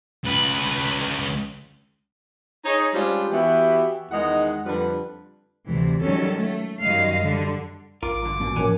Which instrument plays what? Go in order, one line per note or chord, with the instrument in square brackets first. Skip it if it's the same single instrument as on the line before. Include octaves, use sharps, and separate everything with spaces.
[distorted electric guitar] C#2 B4
[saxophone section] D#4 G#4 C#5
G3 G#3 C#4 D4 F4 C5
E3 B3 E4 F#4 G4
E2 D#3 G#3 D#4 F#5
F2 D3 G3 B4
[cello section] D2 C3 E3
D#3 F#3 G3 C#4 A4
A3
F#2 D#3 G3 D#5 F5
D3 G3
[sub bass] A1 [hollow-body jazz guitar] F4 A#4 [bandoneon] D6
[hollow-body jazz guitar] G2 D3
[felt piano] D#1 [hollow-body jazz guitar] F#2 B2
[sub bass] G#2 [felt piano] F3 A#3 C#4 [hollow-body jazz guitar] C#5 F#5 G#5